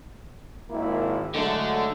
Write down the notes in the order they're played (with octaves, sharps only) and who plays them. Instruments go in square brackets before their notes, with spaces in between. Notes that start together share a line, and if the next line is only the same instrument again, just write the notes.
[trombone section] G#1 A#3 E4
[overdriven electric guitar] D3 D4 [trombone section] F#3 G#3 A3